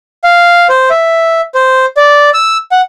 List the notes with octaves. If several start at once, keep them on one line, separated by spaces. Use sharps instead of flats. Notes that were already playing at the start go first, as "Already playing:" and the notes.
F5
C5
E5
C5
D5
E6
F#5